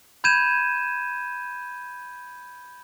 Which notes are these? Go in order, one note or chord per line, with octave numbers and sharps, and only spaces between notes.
B5 G6 G#6 D#7 E7